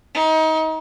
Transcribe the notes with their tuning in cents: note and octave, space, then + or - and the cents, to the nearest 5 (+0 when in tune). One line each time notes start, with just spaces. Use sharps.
D#4 +30